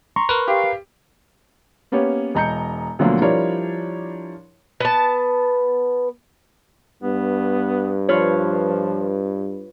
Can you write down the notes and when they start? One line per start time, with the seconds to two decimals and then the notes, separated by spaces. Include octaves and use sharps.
0.16 A#5 C6 C#6
0.29 A#4 B4
0.48 G4 F5
1.92 A#3 B3 C#4 G4 C#5
2.35 E1 D#5 A#5 G6 C#7
2.99 D2 B2 D3 F3 F#3 A#3
3.22 F3 G3 D4 E4 A#4 C#5
4.80 B3 A5
7.03 G2 B3
8.09 F3 F4 B4 C#5